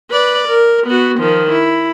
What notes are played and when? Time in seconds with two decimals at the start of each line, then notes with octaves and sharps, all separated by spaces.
0.10 B4 D5
0.48 A#4
0.87 B3 F#4
1.19 D#3 F3
1.51 E4